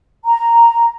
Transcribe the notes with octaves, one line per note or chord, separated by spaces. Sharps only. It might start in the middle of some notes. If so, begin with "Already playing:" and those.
A#5